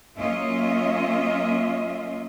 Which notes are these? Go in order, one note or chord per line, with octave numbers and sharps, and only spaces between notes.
F#3 A#3 C#4 F4 D#5 E5